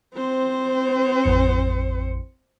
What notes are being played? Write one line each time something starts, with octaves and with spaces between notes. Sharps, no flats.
C4 C5
A1 F2 C#7